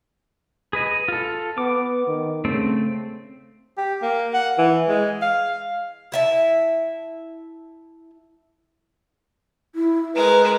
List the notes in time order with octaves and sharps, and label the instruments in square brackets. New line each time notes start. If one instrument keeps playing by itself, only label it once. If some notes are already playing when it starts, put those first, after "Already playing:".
[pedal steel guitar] G#4 B4 D#5
F4 A4
[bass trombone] B3 [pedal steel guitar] D6
[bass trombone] D#3
[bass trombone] C#3 [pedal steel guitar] A3 C4
[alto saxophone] G4
A#3
F#5
E3
G#3
F5
[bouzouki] E4 E5 A5
[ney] E4
[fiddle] G#3 A#4 [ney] B4